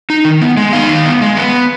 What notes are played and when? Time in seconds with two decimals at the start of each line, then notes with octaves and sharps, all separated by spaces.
0.10 D#4
0.25 D#3
0.41 B3
0.57 G#3
0.73 D#4 F5
0.89 D#3
1.06 B3
1.22 G#3
1.37 B3